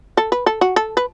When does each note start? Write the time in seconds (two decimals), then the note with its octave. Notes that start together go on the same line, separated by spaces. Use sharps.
0.17 A4
0.32 B4
0.46 A4
0.61 F#4
0.76 A4
0.97 B4